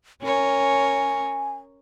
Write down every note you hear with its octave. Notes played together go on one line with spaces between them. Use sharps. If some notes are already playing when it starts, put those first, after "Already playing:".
C#4 A#4 C#5 G#5